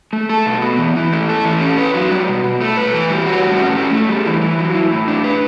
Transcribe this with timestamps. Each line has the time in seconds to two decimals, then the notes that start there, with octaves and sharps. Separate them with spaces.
0.13 A3
0.29 A4
0.46 B2
0.62 B3
0.78 E3
0.96 E3
1.12 A3
1.29 A4
1.45 E3
1.61 C#4
1.78 B4
1.94 F#3
2.11 G3
2.28 B2
2.44 B2
2.61 A3
2.77 B4
2.93 E3
3.09 G3
3.27 F#4
3.43 A2
3.59 C#4
3.77 A3
3.93 A3
4.09 G3
4.26 E3
4.42 E3
4.58 F#3
4.75 E4
4.92 A2
5.08 D4
5.24 B4